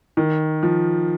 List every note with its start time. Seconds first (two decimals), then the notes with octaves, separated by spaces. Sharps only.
0.17 D#3
0.63 F3